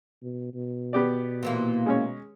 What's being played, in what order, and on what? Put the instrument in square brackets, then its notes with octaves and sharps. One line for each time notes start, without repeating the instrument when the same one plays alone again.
[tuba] B2
B2
[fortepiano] B3 G4 D5
[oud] A#2 E3 A#3
[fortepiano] G#3 C#4 C#5